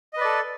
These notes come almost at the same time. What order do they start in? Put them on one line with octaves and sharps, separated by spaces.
D#5 B4 D5 A4